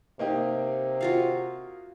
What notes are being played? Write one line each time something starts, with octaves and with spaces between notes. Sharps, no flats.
C3 A#3 D#4 G4
F4 F#4 F5